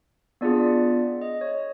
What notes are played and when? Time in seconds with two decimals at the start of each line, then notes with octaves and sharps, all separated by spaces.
0.41 B3 D4 F4 G#4 D5
1.22 D#5
1.41 C#5